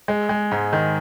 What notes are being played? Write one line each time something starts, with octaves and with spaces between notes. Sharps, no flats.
G#3
G#3
G#2
D#3